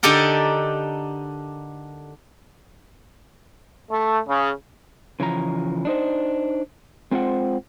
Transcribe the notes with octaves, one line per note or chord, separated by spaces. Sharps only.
D3 D4 D#4 G4 A4 A#4
A3
C#3
C#3 E3 F3 A#5
D4 D#4 C5
G#3 C4 F4 C5 F#5